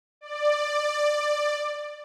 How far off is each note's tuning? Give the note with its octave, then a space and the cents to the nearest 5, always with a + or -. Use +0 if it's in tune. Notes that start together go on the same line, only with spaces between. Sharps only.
D5 +15